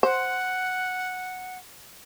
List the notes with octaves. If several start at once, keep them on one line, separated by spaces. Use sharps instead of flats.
C5 F#5